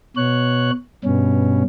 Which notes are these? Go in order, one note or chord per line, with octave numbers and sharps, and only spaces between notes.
B2 C#5 F#6
G2 B2 C#4